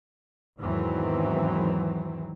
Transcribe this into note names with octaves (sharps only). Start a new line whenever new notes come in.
E2 G#2 D#3 E3 F#3 C4